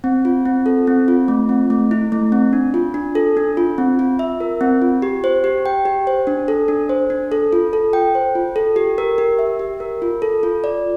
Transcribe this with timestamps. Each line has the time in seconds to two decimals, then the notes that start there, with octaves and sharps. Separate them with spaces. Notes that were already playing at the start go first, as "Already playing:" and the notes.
0.04 C4
0.25 F4
0.45 C4
0.66 A4
0.87 C4
1.08 F4
1.28 A3
1.49 C4
1.70 A3
1.91 E4
2.12 A3
2.32 C4
2.53 D4
2.74 F4
2.94 D4
3.15 A4
3.37 D4
3.57 F4
3.78 C4
3.99 F4
4.19 E5
4.40 A#4
4.61 C4
4.82 F4
5.02 G4
5.24 C5
5.44 G4
5.66 G5
5.85 G4
6.07 C5
6.27 D4
6.48 A4
6.68 D4
6.89 C5
7.10 D4
7.32 A4
7.53 F4
7.73 A4
7.93 G5
8.15 C5
8.35 F4
8.56 A4
8.76 G4
8.98 A#4
9.18 G4
9.39 E5
9.59 G4
9.80 A#4
10.02 F4
10.22 A4
10.43 F4
10.64 D5